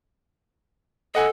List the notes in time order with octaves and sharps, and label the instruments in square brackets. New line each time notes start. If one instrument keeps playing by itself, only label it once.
[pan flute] A4 [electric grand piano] D#5 F#5 G#5